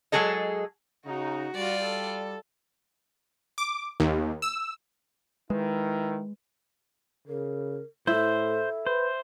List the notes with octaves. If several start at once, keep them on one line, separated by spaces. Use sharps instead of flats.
F#3 G#3 G#4 A4 D#5
C#3 D#4 F#4
G3 F4 D5
A4
D6
D#2
E6
D#3 G#3 E4 B4
C#3 A#4
A2 E4 A4 C5
B4 C5